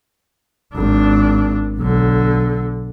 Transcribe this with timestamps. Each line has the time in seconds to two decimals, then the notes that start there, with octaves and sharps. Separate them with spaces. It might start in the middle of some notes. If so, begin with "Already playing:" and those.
0.75 G#1 D4
1.78 B1 D3